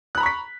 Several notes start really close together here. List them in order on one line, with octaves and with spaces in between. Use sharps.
F#6 B5 A#5 C#6 B6